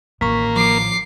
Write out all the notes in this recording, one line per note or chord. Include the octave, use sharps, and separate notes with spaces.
A1 D#3 A#3 C#6 B6
F3 D6 C7